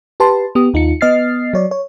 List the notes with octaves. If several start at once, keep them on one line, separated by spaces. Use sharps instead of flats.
G4 B4 A5 C6
B3 G4 D#6
D#2 D#4 F4 C#7
B3 D#5 F6 A6 C7
F#3 C#5 D5
C#5